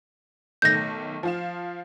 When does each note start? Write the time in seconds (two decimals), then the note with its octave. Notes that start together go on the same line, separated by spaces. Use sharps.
0.62 B1 D#3 A3 G6 A#6
1.23 F3 F4 E7